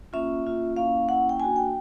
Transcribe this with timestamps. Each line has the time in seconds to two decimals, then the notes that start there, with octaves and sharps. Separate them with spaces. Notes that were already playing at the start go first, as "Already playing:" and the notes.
0.13 A#3 C#4 F4 E5
0.45 A#3 C#4 F4
0.76 A#3 C#4 E4 F5
1.08 A#3 C#4 E4 F#5
1.29 G5
1.39 A#3 D4 F#4 G#5
1.56 G5